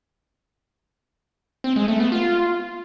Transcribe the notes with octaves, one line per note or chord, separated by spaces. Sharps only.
C4
G#3
A3
B3
F4